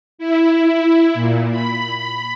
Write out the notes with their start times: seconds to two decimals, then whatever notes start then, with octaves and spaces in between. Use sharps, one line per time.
0.18 E4
1.14 A#2
1.50 B5